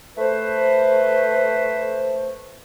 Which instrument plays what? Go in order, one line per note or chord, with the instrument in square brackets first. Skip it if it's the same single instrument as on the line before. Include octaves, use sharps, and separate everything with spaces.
[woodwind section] A3 B4 C5